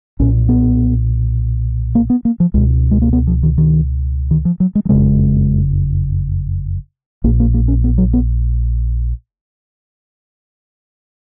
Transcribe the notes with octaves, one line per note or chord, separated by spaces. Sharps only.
B1 A#2 C#4
B3
A#3
B3
A#3
F3
C#2 B2 G#3
G#3
A#3
B3
F3
D#3
D#3
D#3
F3
F#3
G#3
F#3
F#1 F2 C#3 G#3
A#1 A#2 A#3
A#3
A#3
C#4
B3
F#3
B3